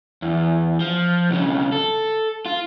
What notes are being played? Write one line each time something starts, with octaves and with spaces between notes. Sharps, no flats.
E2
F3
B1 C#3
A4
F4